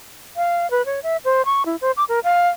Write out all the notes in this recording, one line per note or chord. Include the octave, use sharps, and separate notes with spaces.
F5
B4
C#5
E5
C5
C#6
E4
C5
D6
A#4
F5